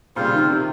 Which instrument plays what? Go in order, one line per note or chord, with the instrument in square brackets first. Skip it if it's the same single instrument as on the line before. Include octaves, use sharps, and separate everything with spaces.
[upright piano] A#2 C#3 [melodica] G3 C4 F4 C5
[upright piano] C3 D#3
C3 D#3